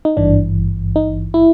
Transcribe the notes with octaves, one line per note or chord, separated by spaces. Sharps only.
D#4
G#1 G2 E3 D4
D#4
E4